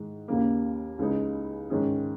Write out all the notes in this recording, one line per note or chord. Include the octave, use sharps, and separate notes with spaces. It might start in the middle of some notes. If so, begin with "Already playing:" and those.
Already playing: G#2 D#3 G#3
D#2 C#3 A#3
C#2 C#3 G#3 D#4
G#2 D#3 C#4 G#4